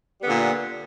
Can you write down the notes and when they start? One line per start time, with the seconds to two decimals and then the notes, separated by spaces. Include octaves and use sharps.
0.21 G3
0.23 B3
0.26 D3
0.29 A#2